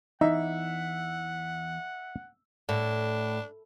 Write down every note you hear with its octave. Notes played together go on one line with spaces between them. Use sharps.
E2 E3 D#4 E5 F#5
A2 D4